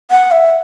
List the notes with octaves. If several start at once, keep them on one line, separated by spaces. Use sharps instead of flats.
F#5
E5